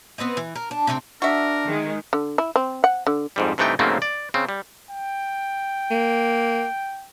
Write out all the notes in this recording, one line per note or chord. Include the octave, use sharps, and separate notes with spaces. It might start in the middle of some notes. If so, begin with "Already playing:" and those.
B3 C4 B4 D#5
E3
A#4
D4
C3 A3 B3 C4
D4 F#4 A#4 E5
D#3 G#3
D3
E4
C4
F#5
D3
F2 G#2 G3
G2 C3 E3 A3 D#4 G5
G#2 C#3 F#3 A3 A#3 C4
D5
C#3 C4
G3
G5
A#3